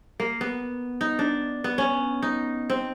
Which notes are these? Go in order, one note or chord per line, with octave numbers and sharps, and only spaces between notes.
A#3
B3
D#4
D4
B3
C#4
D#4
C4